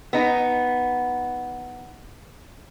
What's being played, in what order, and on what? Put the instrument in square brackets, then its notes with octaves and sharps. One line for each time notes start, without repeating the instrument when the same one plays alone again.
[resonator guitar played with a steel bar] B3 D#4